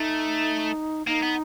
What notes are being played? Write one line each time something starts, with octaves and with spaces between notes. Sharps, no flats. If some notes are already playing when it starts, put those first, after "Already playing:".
Already playing: A3 D#4
A#3 D#4
B3